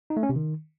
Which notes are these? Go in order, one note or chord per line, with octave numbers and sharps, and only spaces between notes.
D#4
A3
C#4
C3
D#3